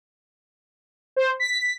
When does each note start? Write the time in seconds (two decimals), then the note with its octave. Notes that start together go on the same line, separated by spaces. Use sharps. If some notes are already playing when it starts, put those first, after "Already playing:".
1.16 C5
1.40 B6